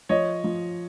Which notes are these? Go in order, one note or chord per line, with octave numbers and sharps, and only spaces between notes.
F3 C#5 D#5
F3